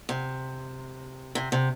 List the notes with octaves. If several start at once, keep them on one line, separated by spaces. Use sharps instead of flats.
C3
C3
C3